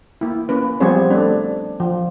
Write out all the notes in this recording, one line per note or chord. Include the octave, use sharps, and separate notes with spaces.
A#3 E4
A#3 C#4 B4
F3 G3 B3 C4 G#4 C#5
A3 D4
F3